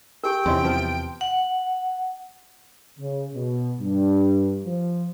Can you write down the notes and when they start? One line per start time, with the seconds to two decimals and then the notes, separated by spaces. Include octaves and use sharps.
0.24 G4 A#4 G5
0.46 E2 C3 C#4 D#4 E4 C6
0.64 F3 B3 E4
1.21 F#5
2.98 C#3
3.33 B2
3.79 G2
4.65 F3